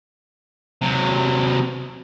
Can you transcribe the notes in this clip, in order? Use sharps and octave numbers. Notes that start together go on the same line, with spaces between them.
C3 F#3